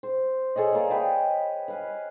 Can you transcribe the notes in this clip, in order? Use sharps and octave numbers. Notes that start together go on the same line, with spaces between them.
C5
G#4 A4 C#5 D#5
A#3 D5
B4 C#5 D#5 G5
B4 F5 G#5